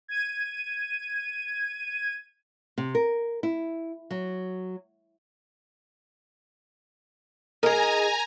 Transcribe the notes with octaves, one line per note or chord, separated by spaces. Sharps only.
G#6 D#7
C3
A#4
E4
F#3
D#4 G#4 A#4 G#5 A#5